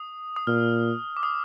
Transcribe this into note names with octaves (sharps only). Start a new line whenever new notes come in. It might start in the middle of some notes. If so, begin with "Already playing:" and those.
Already playing: D#6
D#6
A#2 F6
D6
D#6